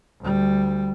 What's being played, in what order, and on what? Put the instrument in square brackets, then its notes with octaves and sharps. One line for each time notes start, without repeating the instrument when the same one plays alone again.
[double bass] D2 G3